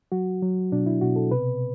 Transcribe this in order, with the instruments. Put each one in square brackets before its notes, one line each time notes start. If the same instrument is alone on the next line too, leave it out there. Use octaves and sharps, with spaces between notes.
[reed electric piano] F#3 F#4
F#3
B2 D4
E4
B2 F#4
A4
C3 B4